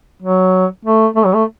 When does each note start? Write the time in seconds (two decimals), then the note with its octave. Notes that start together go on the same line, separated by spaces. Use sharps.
0.22 F#3
0.85 A3
1.16 A3
1.25 F#3
1.34 A3